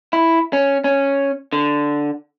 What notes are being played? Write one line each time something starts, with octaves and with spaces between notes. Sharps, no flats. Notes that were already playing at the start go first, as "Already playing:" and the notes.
E4
C#4
C#4
D3